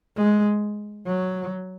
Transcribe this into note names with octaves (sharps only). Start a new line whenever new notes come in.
G#3
F#3